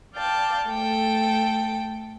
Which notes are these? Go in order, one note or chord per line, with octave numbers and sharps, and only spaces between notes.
D5 F5 G5 A5
A3 A4 G5